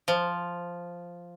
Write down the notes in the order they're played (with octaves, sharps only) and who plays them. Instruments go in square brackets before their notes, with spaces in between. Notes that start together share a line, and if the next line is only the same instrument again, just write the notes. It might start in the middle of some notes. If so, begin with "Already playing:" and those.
[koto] F3